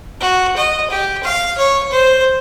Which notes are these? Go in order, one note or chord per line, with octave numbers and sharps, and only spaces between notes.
F#4
D#5
G4
F5
C#5
C5